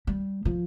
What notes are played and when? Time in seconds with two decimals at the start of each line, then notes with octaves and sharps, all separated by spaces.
0.07 G3
0.45 F3